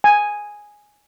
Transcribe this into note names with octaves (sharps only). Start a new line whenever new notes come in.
G#5